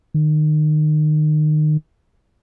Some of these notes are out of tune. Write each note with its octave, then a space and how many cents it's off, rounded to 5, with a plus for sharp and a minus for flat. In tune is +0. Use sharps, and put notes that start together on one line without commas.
D#3 -30